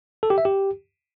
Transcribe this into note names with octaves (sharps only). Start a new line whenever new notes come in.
A4
G4
E5
G4